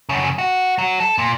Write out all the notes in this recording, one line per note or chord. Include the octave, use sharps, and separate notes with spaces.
F#2 C#3
F#4
F#3
A4
A#2